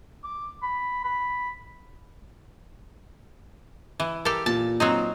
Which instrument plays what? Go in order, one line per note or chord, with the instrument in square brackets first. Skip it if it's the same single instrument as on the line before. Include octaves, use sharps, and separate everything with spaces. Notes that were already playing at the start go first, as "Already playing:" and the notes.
[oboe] D6
B5
B5
[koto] E3
[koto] G4 A4 [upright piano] A#4
[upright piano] A#2 [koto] A5
[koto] F#3 C4 D#4